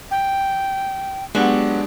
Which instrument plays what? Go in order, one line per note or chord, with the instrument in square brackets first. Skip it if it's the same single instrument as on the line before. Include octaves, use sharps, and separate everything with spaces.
[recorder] G5
[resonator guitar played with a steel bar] F#3 B3 [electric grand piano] G#3 D4 G4